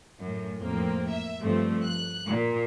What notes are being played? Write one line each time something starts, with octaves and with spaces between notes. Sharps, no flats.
F#2 A2
F2 A2 F3 A#3 C4
E5
G2 F3 A3 C4
F#6
A#2